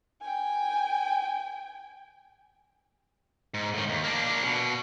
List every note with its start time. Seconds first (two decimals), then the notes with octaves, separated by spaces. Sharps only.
0.21 G5 G#5
3.54 G#2
3.74 A2 D#3
3.89 D#2
4.04 A#3 D4
4.43 B2